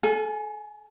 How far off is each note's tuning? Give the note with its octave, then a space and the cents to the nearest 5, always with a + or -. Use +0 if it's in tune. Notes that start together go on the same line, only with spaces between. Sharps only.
A4 -30 G#5 +10